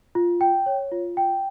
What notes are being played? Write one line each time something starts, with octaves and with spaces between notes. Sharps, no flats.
F4
G5
C#5
F4
G5